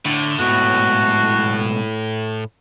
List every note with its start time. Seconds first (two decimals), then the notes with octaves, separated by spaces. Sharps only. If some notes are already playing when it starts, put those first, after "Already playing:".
0.05 A2 D3
0.39 G#2 B2 F#4